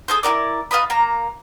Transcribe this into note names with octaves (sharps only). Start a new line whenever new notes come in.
G#4 A4 C5
E4 F4 A#4 D5
F4 B4 D#5 B5
A#3 A#5